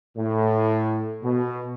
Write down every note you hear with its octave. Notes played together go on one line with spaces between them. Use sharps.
A2
B2